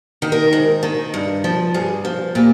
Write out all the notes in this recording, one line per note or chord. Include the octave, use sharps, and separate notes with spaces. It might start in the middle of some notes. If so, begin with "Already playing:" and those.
D#3
A#4
G#2
D#3
G2
F3
G2 G#4
F3
A#2 G4